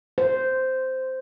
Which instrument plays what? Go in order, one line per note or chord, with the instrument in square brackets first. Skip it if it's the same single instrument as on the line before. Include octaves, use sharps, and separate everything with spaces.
[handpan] C5